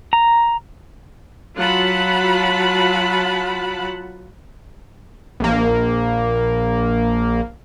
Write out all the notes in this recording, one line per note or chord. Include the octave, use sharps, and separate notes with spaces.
A#5
F#3 F4 F#5 A5 B5
A#1 A#3